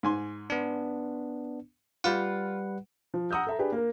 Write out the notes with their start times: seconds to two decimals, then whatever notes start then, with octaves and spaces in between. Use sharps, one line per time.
0.03 G#2 G#5 C6
0.50 B3 D4
2.04 G3 F4 B4 F#5
3.14 F3
3.31 F#5 A#5 D#6 E6 G6
3.47 A4 E5 A#5
3.59 D4 G4 G#4 B4
3.72 A#3 A#4